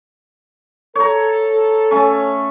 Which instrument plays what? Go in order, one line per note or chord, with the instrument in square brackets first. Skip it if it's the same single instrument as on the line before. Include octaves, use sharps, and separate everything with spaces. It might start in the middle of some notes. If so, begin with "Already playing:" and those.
[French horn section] A4 [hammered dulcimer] C#5 A#5
[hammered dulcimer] A3 C#4